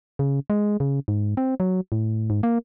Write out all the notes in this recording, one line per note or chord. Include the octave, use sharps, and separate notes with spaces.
C#3
G#3
C#3
G#2
C4
F#3
A2
G#2
A#3